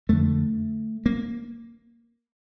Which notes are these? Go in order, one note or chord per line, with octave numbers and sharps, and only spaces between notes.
F2 D3 A3
A#3